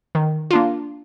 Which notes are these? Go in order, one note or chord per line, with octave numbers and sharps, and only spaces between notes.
D#3
A#3 D4 F4